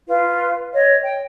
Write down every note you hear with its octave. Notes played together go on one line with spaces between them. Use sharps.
F4 B4
C#5 D#5
G5